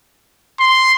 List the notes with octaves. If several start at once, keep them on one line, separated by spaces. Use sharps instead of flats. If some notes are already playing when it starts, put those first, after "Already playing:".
C6